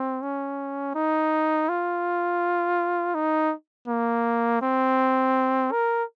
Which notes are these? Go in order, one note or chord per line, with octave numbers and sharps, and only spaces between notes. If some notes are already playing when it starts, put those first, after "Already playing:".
Already playing: C4
C#4
D#4
F4
D#4
A#3
C4
A#4